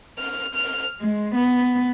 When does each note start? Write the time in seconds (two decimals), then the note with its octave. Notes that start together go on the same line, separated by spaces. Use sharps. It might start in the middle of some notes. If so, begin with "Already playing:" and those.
0.19 F6
0.55 F6
0.99 G#3
1.35 B3